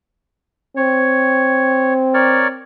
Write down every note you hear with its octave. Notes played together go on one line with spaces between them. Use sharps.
C4 C#5
A#4 C#5 D5